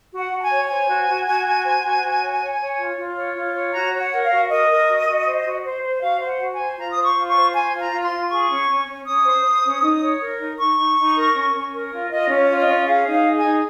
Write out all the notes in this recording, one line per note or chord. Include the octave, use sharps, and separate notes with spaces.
F#4
F#5
F#4
A#5
G#5
C#5
C5 G#5
F#4
F#4
F#4
F#4
C5
F#4
F#4
C#5
C#5
C#5
F4
F4
C#5
F4
C#5
F#4 A#5
C#5
F#5
A#4
F5
F#4
A#4 D#5
A#4
F#4
F#4
C5
F#4
C5
C5
F#4 F5
C5
F#5
F#4
G#5
C5
F4 A#5
C5 D#6
C#6
F4
C#6
C5
C5 G#5
F4
A#5
F4
C6
F4
G#4 C#6
C#4
C#4
C#4
C#4 D#6
C5
C5
C#4
D#4
C#5
A#4
D#4
D#4 C#6
D#4
D#4
A#4
C#4
C#4
A#4
F4
F4 D#5
C#4
C#5
F4
D#5
C#4
G#4 F5
D#4
F5
G#4
G#5
D#4